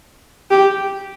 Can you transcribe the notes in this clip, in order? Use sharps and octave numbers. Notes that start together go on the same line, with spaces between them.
G4